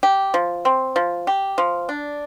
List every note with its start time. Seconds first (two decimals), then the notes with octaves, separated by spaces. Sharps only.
0.03 G4
0.34 F3
0.65 C4
0.96 F3
1.27 G4
1.58 F3
1.89 D4